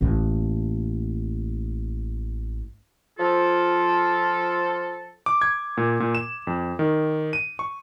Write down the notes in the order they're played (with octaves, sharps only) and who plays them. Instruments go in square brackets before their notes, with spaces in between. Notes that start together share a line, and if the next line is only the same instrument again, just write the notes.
[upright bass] A1 A#3
[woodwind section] F3 F4 A4
[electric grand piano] D6
G#6
A#2
A#2
E7
F2
D#3
D#7
C#6